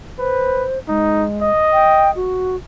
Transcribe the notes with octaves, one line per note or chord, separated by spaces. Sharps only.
B4 C5
G#3 D#4
D#5
G5
F#4